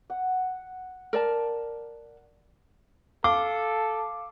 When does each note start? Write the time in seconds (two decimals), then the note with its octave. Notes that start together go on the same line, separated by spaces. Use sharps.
0.10 F#5
1.13 A#4 D5 A5
3.24 A4 F5 D6